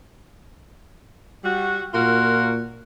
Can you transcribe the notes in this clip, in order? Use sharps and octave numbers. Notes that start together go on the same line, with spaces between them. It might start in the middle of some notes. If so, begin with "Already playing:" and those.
G3 F#4
A#2 F4 F#4 A#4